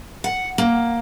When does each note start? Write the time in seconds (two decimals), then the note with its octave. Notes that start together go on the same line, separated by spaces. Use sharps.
0.24 F#5
0.58 A#3